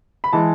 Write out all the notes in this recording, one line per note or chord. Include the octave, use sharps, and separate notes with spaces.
B5
E3 G#3 A5